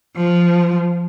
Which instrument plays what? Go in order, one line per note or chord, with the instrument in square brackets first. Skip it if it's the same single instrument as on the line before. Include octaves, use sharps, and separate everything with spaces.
[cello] F3